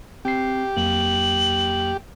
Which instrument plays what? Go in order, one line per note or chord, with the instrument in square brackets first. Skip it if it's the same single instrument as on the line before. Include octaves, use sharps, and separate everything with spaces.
[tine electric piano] C4 C7 [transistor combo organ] G4
[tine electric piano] F2 F#3 A#3 [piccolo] F#7